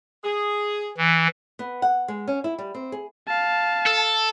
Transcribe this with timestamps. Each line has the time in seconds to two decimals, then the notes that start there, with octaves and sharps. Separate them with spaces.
0.24 G#4
0.98 E3
1.59 B3
1.82 F#5
2.08 G#3
2.28 C#4
2.44 E4
2.59 G3
2.75 C4
2.92 G#4
3.28 F5 A5
3.86 A4